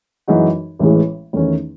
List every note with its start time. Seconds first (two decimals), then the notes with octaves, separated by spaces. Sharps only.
0.28 F#2 E3 G#3 D#4 F#4
0.79 A1 A2 E3 G#3
1.33 E2 D#3 A3 C#4